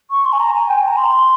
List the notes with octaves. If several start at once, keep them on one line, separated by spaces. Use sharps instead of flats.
C#6
C6
G#5
A#5
G#5
G5
G#5
A#5
C6